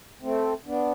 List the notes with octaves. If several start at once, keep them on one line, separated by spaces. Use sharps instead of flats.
A3 C4
B3 D4